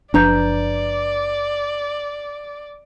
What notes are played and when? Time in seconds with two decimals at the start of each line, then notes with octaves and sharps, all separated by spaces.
0.14 F#1 F3 D4 B4 D5 A#5 G6